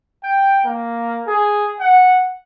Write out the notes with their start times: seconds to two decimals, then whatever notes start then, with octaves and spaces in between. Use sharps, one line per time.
0.23 G5
0.65 A#3
1.27 G#4
1.80 F#5